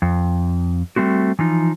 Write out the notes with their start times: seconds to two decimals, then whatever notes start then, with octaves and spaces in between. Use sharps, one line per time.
0.02 F2
0.96 G3 A3 C4 F#4
1.39 E3 F3 D#4